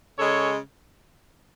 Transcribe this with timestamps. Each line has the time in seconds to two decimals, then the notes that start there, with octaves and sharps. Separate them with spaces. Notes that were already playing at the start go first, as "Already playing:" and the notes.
0.18 C#3 G#3 A4 C#5